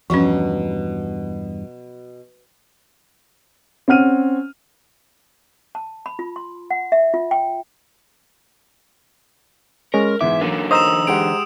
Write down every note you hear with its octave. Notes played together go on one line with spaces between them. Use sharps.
E2 G2 B2 F3 F#3 C#4
C4 C#4 F#5 F6 D#7
A5
B5
F4
C6
F#5
E5
F4
G5
G#3 C#4 A#4
G#2 E3 B3 E5 D6
D3 E3 F#3 A#3
C5 D#5 A#5 D#6 E6 E7
G#3 G4 F#5 D7